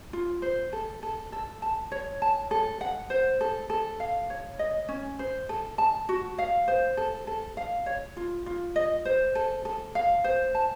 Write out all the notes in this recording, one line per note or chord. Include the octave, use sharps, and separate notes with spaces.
F4
C5
A4
A4
A4
A5
C#5
A5
A4
F#5
C5
A4
A4
F5
C#5
D#5
C#4
C5
A4
A5
F#4
F5
C5
A4
A4
F5
C#5
F4
F4
D#5
C5
A4
A4
F5
C5
A5